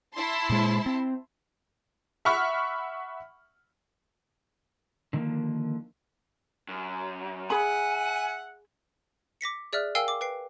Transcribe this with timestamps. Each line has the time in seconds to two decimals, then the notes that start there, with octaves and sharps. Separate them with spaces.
0.14 E4 A5 C6
0.50 A#2 G#3
0.86 C4
2.25 E5 F#5 B5 C#6 F6
5.13 D3 D#3 F3 G#3 A#3
6.69 F#2
7.50 G#4 E5 F#5 G#5 B5
9.41 D6 A#6 B6 C#7
9.73 G#4 D5 E5 F6 F#6
9.95 A#4 F5 G5 G#5 E6 C7
10.08 D6
10.21 B4 G5 C7